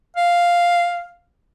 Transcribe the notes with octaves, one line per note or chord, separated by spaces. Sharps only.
F5